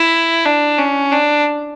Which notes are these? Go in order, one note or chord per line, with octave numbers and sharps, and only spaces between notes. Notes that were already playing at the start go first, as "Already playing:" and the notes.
Already playing: E4
D4
C#4
D4